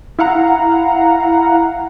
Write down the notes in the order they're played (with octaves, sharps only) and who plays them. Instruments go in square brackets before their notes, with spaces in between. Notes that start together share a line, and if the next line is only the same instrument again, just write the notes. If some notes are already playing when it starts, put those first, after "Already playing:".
[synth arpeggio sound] E4 F5 F#5 A#5